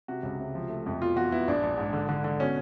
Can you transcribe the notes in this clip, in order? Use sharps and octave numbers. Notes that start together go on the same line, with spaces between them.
C3 F#4
C#2
C3
F3
A3
F2
B2 F4
E2 F#4
B3 E4
A#1 D4
A#1
G#2
D3
D3
D3
B2 C#4